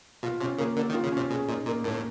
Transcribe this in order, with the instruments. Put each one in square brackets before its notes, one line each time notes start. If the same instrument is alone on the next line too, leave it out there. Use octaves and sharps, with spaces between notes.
[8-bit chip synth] B2 [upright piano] F4
[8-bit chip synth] C3 [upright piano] C#4
[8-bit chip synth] C#3 [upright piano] A#3
[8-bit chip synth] D3 [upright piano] A#3
[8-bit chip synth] D#3
[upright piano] F4
[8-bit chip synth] C#3
[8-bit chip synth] C3 [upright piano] C#4
[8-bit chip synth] B2 [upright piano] G#4
[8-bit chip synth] A#2 [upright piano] D#4
[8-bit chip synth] A#2 [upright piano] A#3
[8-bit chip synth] A2 [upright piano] A#3